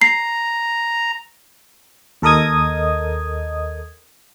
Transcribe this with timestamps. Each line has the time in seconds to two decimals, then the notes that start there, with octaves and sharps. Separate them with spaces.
0.01 A#5 C7
2.22 D#2 A4 A#4 D#5 D#6 G#6